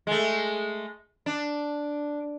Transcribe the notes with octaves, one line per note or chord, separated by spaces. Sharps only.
G#3 A3
D4